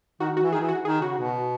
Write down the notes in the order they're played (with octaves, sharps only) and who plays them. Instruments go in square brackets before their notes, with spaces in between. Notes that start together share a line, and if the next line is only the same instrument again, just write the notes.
[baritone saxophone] D#3 [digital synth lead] F#4
[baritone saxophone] D#3
[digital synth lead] F#4
[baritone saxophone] E3
[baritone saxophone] D#3 [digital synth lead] G#4
[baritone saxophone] E3
[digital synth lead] F#4
[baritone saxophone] D#3 [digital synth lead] G#4
[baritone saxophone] C#3 [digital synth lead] F#4
[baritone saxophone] B2